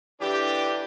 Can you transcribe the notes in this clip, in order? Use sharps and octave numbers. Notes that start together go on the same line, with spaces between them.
D3 E3 D4 G4